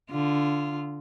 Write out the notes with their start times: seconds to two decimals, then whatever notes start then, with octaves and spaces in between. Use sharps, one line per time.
0.11 D3 F4